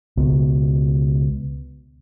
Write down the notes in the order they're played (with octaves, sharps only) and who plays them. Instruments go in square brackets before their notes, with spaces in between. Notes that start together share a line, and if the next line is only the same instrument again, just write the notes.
[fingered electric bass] C#2 B2